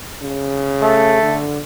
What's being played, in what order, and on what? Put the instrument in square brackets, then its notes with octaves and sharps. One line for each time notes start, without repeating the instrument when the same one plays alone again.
[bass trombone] C#3
[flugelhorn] A3
[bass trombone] D3